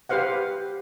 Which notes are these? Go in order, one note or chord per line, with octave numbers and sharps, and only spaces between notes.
G4 B4 C5 F5 F#5